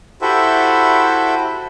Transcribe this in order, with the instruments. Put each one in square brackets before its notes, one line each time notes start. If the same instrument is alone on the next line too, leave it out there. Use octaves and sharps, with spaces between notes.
[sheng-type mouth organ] E4 F#4 G4 A4 C5 E5